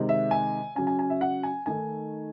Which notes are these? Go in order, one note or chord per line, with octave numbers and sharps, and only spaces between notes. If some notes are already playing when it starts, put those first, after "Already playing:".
Already playing: C3 D#3 G#3
E5
G#5
C#3 F#3 C#4 G#5
G#5
G#5
E5
F#5
G#5
D#3 A3 D#4 G#5